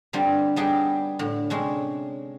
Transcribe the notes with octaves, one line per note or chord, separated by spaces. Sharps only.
D3 G3 C4 D4 F4
G3 B3 D4 D#4 G#4 G5
A2 D3
C3 G#3 C#4 D4